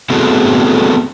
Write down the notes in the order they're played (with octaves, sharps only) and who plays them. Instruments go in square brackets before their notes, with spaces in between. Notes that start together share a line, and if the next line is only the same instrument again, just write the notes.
[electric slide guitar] A3 B3 C4 F#4 G#4 A4